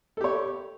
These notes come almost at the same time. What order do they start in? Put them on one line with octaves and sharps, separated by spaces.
A4 G4 C#5